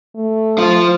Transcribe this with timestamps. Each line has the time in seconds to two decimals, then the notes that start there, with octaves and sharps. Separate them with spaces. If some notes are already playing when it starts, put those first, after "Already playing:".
0.15 A3
0.58 F4 C5